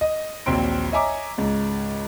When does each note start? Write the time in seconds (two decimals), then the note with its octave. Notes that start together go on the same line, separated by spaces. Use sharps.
0.01 D#5
0.46 A#1 D#2 F#3 C4 C6 D7
0.92 C#5 D#5 E5 G#5 A#5 D6
1.38 C#2 G#2